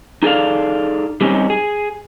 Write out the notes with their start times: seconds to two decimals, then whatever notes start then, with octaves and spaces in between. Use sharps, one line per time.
0.23 D#4 G#4 A4 D5 F5
1.21 G3 C4 C#4 D#4
1.50 G#4